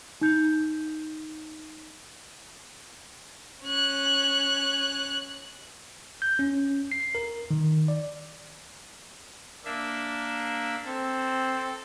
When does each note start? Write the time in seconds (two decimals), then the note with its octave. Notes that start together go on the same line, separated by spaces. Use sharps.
0.21 D#4 G6
3.63 C#4 F#6
6.22 G6
6.39 C#4
6.92 C7
7.15 A#4
7.51 D#3
7.88 D5
9.65 A#3 D4 E5
10.86 C4 A4